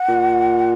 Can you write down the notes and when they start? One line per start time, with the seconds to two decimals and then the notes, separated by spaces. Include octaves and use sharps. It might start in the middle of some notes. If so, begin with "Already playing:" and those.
Already playing: F#5
0.09 A#2